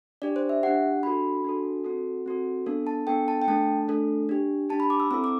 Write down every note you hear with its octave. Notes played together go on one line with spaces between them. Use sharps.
D4 G4 D5
C5
E5
D4 G4 F#5
D4 F#4 A4 B5
D4 F#4 A4
C4 F#4 A4
C4 F#4 A4
B3 D4 A4
A5
B3 D4 A4 G5
A5
G5
A3 D4 A4 A5
A3 D4 A4
D4 G4
D4 G4 A5
B5
D6
E6
C4 E4 A4 E6
D6